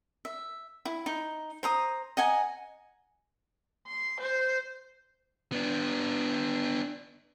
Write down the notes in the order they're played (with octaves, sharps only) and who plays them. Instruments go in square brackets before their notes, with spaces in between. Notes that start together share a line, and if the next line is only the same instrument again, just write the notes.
[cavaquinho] E5
E4
D#4
C5 A#5 D#6
D#5 F#5 G#5 A#5
[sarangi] C6
C5
[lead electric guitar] B3 D4